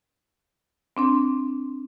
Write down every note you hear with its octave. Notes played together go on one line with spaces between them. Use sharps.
C4 D4 C6